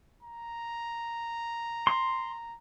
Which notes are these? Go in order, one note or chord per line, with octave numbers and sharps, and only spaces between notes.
A#5
C6